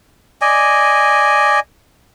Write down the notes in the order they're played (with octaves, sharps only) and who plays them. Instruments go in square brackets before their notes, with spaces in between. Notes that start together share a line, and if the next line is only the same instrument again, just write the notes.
[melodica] D5 D#5 G#5